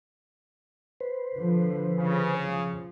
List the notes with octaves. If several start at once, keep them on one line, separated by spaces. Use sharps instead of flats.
B4 C5
D3 F3
C#3
F3